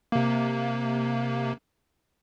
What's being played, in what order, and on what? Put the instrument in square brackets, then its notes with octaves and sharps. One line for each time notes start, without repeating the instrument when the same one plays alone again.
[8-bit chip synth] C3 A#3